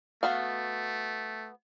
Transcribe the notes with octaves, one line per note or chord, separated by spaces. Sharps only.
A3 B3 F#4 F5